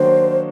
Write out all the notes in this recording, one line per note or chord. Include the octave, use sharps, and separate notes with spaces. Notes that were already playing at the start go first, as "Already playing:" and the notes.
Already playing: D#3 F#3 A#3 D4 F#4 C5